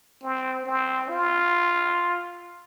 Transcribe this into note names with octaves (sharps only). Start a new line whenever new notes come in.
C4
C4
F4